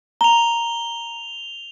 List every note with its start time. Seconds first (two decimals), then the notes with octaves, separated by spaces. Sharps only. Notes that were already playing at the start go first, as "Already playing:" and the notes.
0.21 A#5 F7 G7